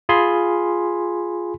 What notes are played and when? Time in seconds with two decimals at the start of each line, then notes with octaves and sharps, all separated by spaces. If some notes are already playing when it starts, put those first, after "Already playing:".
0.09 F4 G#4 G#5 B5 C6